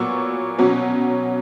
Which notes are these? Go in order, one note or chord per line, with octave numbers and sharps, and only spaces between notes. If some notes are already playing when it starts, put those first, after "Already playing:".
Already playing: A#2 F#3 B3 C#6 E6
B2 F#3 C#4